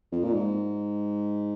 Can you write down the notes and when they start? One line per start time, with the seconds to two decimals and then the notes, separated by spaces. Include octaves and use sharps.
0.12 F2
0.24 A#2
0.34 G#2